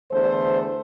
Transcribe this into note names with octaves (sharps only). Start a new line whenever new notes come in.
E2 D3 A3 D4 C5